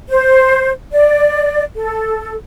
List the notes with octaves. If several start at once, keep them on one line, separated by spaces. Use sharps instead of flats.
C5
D5
A4